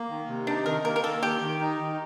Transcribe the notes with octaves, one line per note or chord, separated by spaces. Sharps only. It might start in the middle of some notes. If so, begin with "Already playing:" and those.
Already playing: A#3
D#3
C3
D4 D#4
D#3 A#4
A#3 A#4
A#4
D#3 A4
D#3 G4
D#3
D#4
D#3